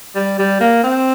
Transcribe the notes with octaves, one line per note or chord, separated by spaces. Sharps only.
G3
G3
A#3
C4